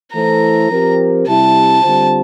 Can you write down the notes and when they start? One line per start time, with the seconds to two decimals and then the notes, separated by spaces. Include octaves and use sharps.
0.14 E3 A3 E4 A4 C5 A#5
0.70 F3 C4 G4 A#4
1.27 C3 G3 C4 E4 A5
1.83 D3 G3 C4 F4 C5